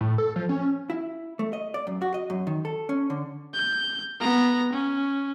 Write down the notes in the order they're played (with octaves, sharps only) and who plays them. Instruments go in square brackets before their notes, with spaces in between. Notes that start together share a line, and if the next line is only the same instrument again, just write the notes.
[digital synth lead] A2
A4
F3
C#4
[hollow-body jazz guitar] E4
A3
D#5
D5
F#2
F#4
D#5
F#2
D#3
A4
C#4
D3
[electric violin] G6
B3 A#5
C#4